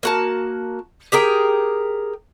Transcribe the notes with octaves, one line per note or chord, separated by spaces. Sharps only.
A#3 F#4 A5
G4 G#4 A#4 G5